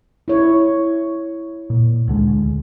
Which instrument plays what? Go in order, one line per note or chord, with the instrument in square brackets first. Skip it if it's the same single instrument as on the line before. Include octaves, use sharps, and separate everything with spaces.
[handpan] E4 C#5
[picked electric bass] A#2
D2 D3 G#3